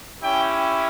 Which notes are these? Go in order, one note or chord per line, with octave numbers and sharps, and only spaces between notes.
C#4 E4 G4 G5